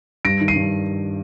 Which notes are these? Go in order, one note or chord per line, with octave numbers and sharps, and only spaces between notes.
G2 A#6 D7
D#3
C7 D#7
G2